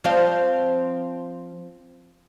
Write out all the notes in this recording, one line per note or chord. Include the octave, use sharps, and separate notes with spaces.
F3 C4 F5